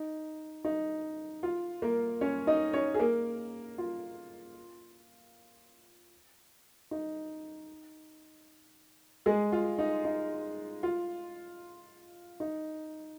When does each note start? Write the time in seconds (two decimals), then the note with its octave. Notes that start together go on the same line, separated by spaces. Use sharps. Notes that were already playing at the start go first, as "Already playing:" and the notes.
Already playing: D#4
0.65 D#4
1.43 F4
1.82 A#3 A#4
2.21 C#4 C#5
2.47 D#4 D#5
2.73 C#4 C#5
2.94 G#4
2.99 A#3 A#4
3.78 F4
6.91 D#4
9.26 G#3 G#4
9.52 F4
9.79 D#4
10.05 D#4
10.83 F4
12.40 D#4